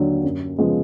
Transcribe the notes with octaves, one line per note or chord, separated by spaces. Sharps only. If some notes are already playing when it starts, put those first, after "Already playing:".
Already playing: D#2 D3 F#3
F#2
C#3 F3 G#3 B3